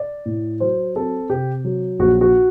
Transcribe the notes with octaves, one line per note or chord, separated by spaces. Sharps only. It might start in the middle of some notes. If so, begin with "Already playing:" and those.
Already playing: D5
A2
F#3 C5
C4 A4
C3 G4
F#3
A#1 F#4
F#4